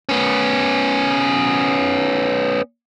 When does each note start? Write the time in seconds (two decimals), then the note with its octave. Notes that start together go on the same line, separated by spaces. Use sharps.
0.09 B3 C#4